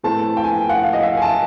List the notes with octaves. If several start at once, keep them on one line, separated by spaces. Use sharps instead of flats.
A2 E3 A3 C4 A5
G5
G#5
F#5
F5
D#5
E5
F5
G#5
A5